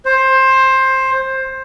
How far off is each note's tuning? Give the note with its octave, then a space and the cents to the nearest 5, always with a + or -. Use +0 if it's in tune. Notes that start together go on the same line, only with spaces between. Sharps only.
C5 +15